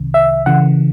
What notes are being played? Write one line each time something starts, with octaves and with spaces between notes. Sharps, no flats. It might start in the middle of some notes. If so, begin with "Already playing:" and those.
Already playing: C2 C3 D#3
E5
C#3 E3 F#5